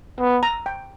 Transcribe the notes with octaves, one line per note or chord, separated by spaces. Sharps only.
B3
A#5
G5